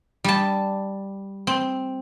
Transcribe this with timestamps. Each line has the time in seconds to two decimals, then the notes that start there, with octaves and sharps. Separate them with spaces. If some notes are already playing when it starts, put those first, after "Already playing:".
0.24 G3 A5
1.47 C4